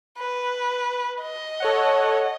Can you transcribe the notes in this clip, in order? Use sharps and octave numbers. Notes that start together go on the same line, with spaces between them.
B4
D#5
A4 C#5 F#5